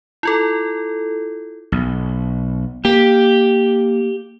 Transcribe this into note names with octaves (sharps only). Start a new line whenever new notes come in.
E4 F4 A4
B1
A#3 G4